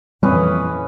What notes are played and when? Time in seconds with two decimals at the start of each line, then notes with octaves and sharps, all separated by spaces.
0.23 F2 A#2 E3 G3 C4 C#4 B4 D#5